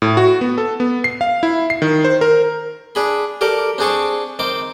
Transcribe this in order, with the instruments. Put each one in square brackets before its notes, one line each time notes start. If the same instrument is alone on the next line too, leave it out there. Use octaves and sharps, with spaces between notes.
[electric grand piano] A2
F#4
B3
A4
B3
C7
F5
E4
C7
D#3
C5
A#4
[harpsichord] D4 G#4 B5
G4 A4 A#4 D5
C4 D4 G#4 A5 C#6
D#3 C4 D6